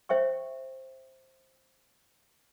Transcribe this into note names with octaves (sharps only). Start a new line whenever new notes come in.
C5 E5 G5 C#6